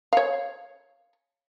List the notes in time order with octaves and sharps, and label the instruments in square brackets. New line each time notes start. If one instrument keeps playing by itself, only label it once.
[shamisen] C#5 F5